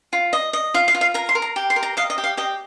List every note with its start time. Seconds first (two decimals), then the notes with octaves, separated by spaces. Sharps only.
0.13 F4
0.33 D#5
0.53 D#5
0.74 F4 F5
0.88 F5
0.95 F4
1.01 F5
1.14 A#4 A#5
1.29 C6
1.35 A#4
1.42 A#5
1.56 G4
1.70 C6
1.76 A#4
1.83 A#5
1.97 D#5 F5
2.10 D#5
2.18 G4
2.24 F5
2.37 G4 D#5